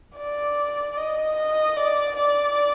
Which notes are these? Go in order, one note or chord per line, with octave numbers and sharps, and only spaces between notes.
D5
D#5
D#5
D5
D5